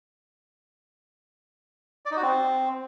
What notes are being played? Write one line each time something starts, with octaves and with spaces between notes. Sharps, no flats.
D5
D#4
F#4
C4